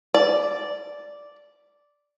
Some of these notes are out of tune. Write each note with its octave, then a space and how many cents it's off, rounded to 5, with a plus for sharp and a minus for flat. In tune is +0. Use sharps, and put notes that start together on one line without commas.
D5 -5